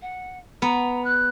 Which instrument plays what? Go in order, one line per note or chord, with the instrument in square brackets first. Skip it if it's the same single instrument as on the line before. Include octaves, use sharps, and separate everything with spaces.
[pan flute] F#5
[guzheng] B3 [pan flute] A#5
[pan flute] F#6